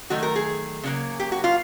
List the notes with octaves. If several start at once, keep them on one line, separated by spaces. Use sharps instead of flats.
D#3 F#3 A3 F#4
A#4
G#4
C#3 F#3 A#3
G4
F#4
F4